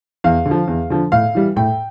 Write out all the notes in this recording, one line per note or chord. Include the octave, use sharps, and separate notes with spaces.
E2 F5
D3
F3
E2
D3 F3
A2 F5
E3 G3
A2 G5